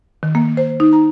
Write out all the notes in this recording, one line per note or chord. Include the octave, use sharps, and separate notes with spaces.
D#3
A#3
C5
D#4
A#5